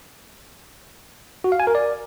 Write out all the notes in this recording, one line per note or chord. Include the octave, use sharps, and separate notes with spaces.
F#4
F5
G#5
A#4
D5